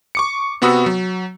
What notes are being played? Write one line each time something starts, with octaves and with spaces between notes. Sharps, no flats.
C#6 D6 C#7
C3 B3 F#4 B5 D#6 E6
F#3